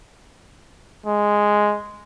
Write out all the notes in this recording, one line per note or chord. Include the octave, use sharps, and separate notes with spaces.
G#3